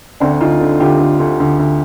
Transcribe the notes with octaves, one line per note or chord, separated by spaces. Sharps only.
D2 C4 D4
D2 D#4 F4
D3
D2 F4 G4
D3
D2
D2
D2